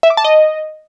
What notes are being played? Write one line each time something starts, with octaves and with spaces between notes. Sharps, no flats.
E5
D6
A5
D#5